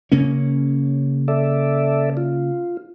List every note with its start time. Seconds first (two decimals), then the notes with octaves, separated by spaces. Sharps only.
0.12 C#3 A#3 C#4
1.28 A4 D5 E5
2.17 F4